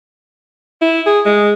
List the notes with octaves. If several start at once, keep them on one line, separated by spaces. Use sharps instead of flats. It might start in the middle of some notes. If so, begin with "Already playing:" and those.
E4
G#4
G#3